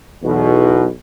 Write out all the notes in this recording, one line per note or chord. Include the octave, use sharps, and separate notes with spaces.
B1 E2 B2